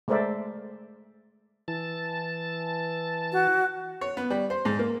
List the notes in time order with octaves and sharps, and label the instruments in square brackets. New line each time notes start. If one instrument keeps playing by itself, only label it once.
[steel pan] G#3 A3 A#4 C5 D5 E5
[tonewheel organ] E3 A5
[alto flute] F#4
[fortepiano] C#5
B3
G3
C5
G#2
A#3